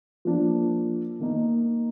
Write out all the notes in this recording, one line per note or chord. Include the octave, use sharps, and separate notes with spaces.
F3 A#3 D4
D#3 A#3 D#4